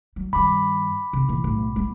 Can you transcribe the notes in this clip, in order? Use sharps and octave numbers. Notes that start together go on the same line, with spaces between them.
F#3
G2 D#3 B5 D6
C3
A#2 E3
B1 A2
G#3 B3